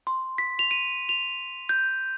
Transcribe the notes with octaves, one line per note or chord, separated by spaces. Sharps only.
C6
B6
F7
D#7
F7
G6